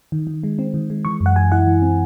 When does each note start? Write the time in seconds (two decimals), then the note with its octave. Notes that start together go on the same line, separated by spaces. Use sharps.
0.12 D#3
0.27 D#3
0.43 G#3
0.59 C4
0.74 D#3
0.90 G#3
1.05 E3 C#6
1.20 F#2
1.26 F#5
1.36 E3 G#5
1.52 E4 F#5
1.67 E3
1.82 C4